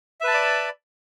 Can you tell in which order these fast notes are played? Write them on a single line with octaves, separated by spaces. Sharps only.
E5 B4 A5 B5 D5